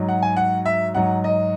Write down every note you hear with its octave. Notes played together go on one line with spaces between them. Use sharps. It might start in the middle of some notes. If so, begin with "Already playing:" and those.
Already playing: G#2 F#3
F#5
G#5
F#5
E5
G#2 F#3 F#5
D#5